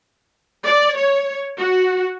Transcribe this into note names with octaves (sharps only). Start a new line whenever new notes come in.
D5
C#5
F#4